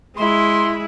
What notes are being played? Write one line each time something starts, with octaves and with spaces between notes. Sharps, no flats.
G#3 E4 C6